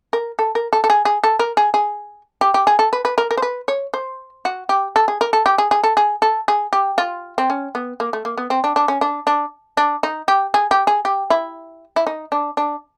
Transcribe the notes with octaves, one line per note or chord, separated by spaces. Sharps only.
A#4
A4
A#4
A4
A4
G#4
G#4
A4
A#4
G#4
G#4
G4
G4
G#4
A4
B4
B4
A#4
A#4
C5
B4
C#5
C5
F#4
G4
A4
G#4
A#4
A4
G4
G#4
G#4
A4
G#4
A4
G#4
G4
F4
C4
C#4
B3
A#3
A3
A#3
B3
C4
D4
D4
C#4
D4
D4
D4
D#4
G4
G#4
G4
G#4
G4
E4
E4
D#4
D4
D4